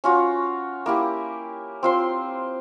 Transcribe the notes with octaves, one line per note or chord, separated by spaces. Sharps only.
C#4 F4 F#4
A#3 E4 G4
C4 F4 C6